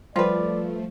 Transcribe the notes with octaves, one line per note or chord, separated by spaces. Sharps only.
F3 G3 A3 F4 B4 C5 D5 C6